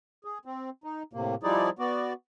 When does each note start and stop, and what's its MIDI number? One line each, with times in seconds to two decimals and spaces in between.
0.25 0.38 68
0.45 0.70 60
0.84 1.03 63
1.13 1.35 45
1.13 1.35 48
1.13 1.35 58
1.43 1.70 53
1.43 1.70 55
1.43 1.70 63
1.43 1.70 64
1.43 1.70 68
1.43 1.70 74
1.79 2.13 59
1.79 2.13 66
1.79 2.13 74